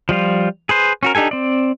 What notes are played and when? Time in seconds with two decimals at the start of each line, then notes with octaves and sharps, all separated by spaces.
0.09 F3 G3 F4
0.69 G#4 B4 C5
1.03 C#4 F#4 A#4
1.15 D4 D#4 G4 A4 G#5
1.31 C4 D5